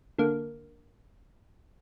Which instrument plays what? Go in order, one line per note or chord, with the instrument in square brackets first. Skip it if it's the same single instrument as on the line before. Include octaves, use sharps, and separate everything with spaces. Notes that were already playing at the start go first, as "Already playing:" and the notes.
[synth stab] D3 A#3